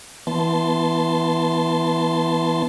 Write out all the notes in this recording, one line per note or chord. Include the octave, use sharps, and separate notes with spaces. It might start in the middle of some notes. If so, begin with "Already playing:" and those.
E3 B3 A5 C6